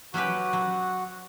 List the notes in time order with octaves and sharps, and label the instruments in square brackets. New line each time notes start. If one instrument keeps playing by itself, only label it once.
[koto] F#3 C#4 G4 B4 [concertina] F#4
[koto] F#3